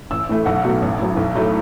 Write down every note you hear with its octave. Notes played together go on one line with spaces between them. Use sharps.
A1 E6
A2 E3 A3
B1 F#5
B2 F#3 A3
A1
A2 F#3
B1
A2 F#3 A3